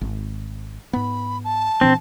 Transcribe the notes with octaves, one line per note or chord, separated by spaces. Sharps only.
G#1
G#2 B3 B5
A5
A#2 E3 C4 D4